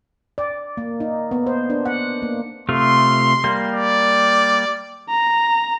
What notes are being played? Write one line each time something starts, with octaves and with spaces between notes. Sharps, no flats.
D5
A#3
D#4
B3
C5
D4
F#5
A#3
C3 A3 F4 C6
G3 A#3
D5
A#5